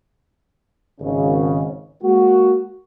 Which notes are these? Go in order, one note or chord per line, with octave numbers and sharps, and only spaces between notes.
G#1 C#3
G#3 A#3 F#4